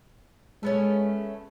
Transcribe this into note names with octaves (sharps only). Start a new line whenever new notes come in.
G#3 A3 B3 C#4